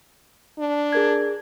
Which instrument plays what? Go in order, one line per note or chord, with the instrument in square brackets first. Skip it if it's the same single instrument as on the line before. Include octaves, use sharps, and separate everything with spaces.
[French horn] D4
[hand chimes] G#4 A#4 G#6